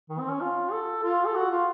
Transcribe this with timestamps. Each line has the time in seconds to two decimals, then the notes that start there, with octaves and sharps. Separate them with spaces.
0.09 D#3
0.19 C4
0.30 C#4
0.41 F4
0.72 A4
1.03 F4
1.26 A4
1.35 F#4
1.51 F4